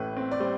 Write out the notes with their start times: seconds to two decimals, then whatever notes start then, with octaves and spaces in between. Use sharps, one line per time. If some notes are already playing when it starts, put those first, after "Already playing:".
Already playing: A1 A2 B4
0.17 C4
0.32 D5
0.40 G3 C5